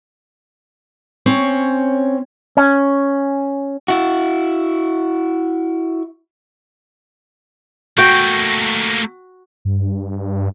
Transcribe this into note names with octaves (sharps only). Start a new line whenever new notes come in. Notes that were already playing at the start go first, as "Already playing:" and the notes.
C4 C#4 C#5
C#4
E4 F#4
A3 A#3 F#4 G5
G2